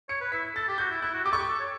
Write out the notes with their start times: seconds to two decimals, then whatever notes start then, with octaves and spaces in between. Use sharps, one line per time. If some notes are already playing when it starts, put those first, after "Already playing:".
0.09 C#5 C#7
0.20 B4
0.32 E4 B6
0.55 A4 A6
0.68 G4
0.78 F#4 G6
0.90 E4
1.01 E4 F#6
1.14 F#4
1.25 G4 D6
1.31 A4 C#6
1.37 G4
1.41 D6
1.48 A4
1.60 C#5